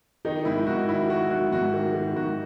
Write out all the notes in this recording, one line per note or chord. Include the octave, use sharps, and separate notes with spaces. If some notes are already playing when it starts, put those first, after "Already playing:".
D#3 D#4
G#2 E4
G#2 F#4
D#3 E4
D#3 F#4
G#2 F#4
G#2 F#4
D#3
D#3
G#2 F#4